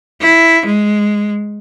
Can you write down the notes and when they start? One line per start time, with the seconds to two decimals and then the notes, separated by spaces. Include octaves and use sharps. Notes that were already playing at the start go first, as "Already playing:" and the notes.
0.21 E4
0.65 G#3